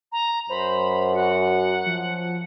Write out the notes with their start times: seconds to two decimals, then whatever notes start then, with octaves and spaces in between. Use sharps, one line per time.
0.12 A#5
0.49 F#2 C5 B5
1.13 F#4 F#5
1.86 F3